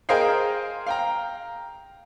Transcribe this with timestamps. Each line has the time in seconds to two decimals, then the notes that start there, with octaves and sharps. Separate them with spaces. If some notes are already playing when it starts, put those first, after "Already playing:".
0.09 G#4 A#4 C5 D#5 F5 G5
0.87 F5 G5 A#5